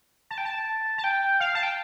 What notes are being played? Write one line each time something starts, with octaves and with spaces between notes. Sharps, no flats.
A5
G5
A5
A5
G5
F5
A5
G5